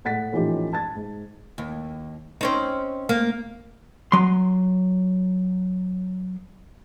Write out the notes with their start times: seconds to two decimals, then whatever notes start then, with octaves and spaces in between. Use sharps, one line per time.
0.05 A2 F#5 A6 B6
0.32 A2 E3 F3 C#4 D#4 G4
0.73 A5 G#6 A6
0.95 G#2
1.58 D#2
2.41 C4 C#4 D#4
3.09 A#3
4.12 F#3 C6